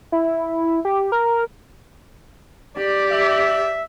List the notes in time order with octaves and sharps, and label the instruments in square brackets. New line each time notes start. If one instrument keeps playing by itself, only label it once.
[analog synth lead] E4
G4
A#4
[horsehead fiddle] G4 D5
[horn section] E5